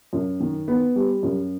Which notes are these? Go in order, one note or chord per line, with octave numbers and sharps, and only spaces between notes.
F#2
D#3
B3
G3
F#2